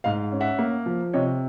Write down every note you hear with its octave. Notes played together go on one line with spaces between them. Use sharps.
G#2 D#5 F5
C#4
E5 F#5
A#3
F3
C3 C#5 D#5